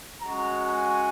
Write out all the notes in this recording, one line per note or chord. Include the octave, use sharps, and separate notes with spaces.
G#3 C#4 F#4 A#5
G#5